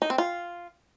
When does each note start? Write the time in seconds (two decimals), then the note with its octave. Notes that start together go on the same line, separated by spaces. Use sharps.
0.02 D#4
0.10 C4
0.18 F4